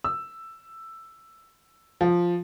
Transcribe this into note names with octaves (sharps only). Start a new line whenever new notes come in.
E6
F3